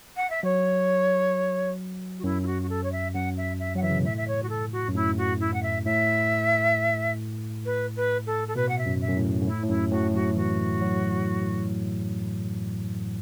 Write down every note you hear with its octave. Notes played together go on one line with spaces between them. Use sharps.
F#5
E5
F#3 C#5
F#4
F#2 E4
E4
F#4
F#4
A4
C#5
E5
F#2 F#5
E5
E5
F#3 F#5
E3 E5
C#3
B2
A2 E5
E5
C#5
F#4
A4
F#4
F#2
A2 E4
F#4
E4
F#5
E5
A2 E5
B4
B4
A4
A4
B2 B4
F#5
E5
F#2
E5
F#2
A2
F#2
A2 E4
A2
F#2 E4
A2 F#4
F#3 F#4
E3 F#4
F#3